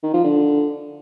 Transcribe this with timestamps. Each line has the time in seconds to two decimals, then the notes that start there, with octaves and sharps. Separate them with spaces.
0.03 D#3
0.14 F3
0.24 D3